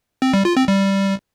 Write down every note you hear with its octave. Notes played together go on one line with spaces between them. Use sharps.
C4
G3
F4
C4
G3